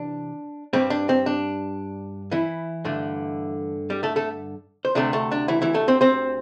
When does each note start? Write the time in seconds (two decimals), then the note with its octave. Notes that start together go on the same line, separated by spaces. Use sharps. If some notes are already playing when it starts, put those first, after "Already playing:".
Already playing: C3 E3 D4
0.73 G2 G3 C4
0.90 D4
1.09 C4
1.26 D4
2.31 E3 E4
2.85 G2 D3 A3
3.90 G3 G4
4.03 A3 A4
4.16 A3 A4
4.85 C5
4.95 D2 C3 A3 D4 D5
5.13 A3 A4
5.32 D4
5.48 E3 E4
5.62 E3 E4
5.74 A3 A4
5.88 C4 C5
6.01 C4 C5